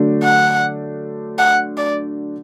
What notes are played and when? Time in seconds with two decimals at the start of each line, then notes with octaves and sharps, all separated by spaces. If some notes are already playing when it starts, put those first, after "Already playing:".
Already playing: D3 F#3 A3 D4
0.24 F#5
1.39 F#5
1.78 D5